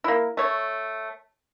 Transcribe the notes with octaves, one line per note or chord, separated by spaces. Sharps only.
A#3 E4
A3 C#5